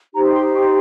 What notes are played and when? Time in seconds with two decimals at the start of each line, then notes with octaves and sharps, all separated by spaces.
0.13 D#4 G4 C5 A#5
0.33 C6
0.54 C#6